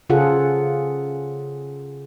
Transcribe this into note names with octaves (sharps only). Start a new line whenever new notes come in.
C#3 F4 G#4 A4 F#5